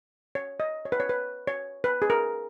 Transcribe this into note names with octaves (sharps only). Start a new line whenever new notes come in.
C#5
D#5
C#5
B4
C#5
B4
C#5
B4
G#4
A#4